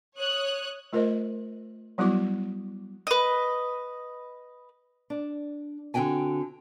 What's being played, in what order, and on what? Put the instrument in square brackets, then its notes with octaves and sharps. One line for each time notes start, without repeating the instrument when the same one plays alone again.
[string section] C#5 D#6 F#6
[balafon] A3 F4 A#4 C5 D#5
F#3 G3 B3 E4 F#4 D6
[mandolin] B4 D#5
[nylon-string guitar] D4
D3 C4 F#4 G5 G#5